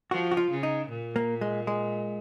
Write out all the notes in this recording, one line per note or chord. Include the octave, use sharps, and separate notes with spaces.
F3 F#4
F#4
F4
C#3
D#4
A#2
A#3
G#3
G#3